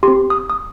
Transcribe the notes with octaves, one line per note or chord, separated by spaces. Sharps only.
C4 G4 C6
D#6
D#6